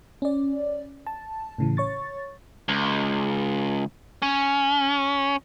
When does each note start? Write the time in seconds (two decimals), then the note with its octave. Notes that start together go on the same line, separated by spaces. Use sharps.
0.22 C#4 D5
1.07 A5
1.58 A2 C#3 E3
1.77 C#5 C#6 A6
2.69 C#2
4.22 C#4